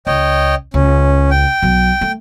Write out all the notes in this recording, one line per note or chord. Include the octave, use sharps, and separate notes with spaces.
C#2 C#5 D#5 G5
C#2 C#4
G5
B1 F#3
A3